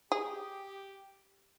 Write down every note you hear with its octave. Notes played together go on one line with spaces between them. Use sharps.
G4 G#4